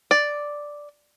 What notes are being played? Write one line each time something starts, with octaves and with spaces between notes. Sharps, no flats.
D5